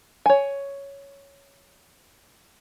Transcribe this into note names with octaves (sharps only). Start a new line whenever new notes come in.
C#5 G#5